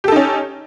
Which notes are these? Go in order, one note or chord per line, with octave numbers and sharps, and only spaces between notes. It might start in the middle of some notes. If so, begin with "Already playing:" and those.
C#4 D#4 G4 A4